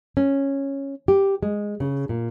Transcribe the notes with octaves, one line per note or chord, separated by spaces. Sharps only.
C#4
G4
G#3
C#3
A#2